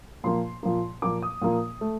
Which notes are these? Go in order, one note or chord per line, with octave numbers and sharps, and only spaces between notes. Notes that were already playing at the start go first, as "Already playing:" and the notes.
A#2 F3 A#3 C6
A#2 F3 A#3
A#2 F3 A#3 D6
D#6
A#2 F3 A#3
A3